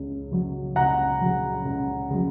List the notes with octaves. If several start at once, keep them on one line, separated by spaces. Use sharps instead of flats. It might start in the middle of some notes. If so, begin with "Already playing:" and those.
Already playing: C#2 C#3
C#3 F#3
C#2 F#5 A#5
C#3 F#3
C#2
C#3 F#3